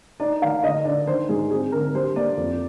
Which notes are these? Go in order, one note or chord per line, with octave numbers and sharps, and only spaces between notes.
D#4 D5
D#3 F5
D3 D#5
D3 D5
D#3 C5
G#2 G#4
C4 G#4
D3 A#4
G3 C5
A#3 D5
F2